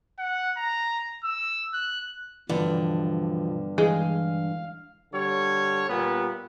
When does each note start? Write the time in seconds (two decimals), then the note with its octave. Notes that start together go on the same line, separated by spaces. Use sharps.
0.19 F#5
0.57 A#5
1.24 E6
1.74 F#6
2.49 G2 B2 D3 E3 F3
3.78 E3 G#3 F5
5.13 D3 G3 C#5
5.88 A#2 G3 B3